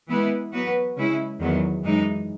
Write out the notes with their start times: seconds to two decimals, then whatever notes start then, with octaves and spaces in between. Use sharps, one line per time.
0.09 E3 G#3 B3 E4 B4
0.53 F#3 B3 F#4 B4
0.97 C#3 G#3 C#4 E4
1.40 E2 D#3 F#3 B3
1.84 F#2 E3 G#3 D#4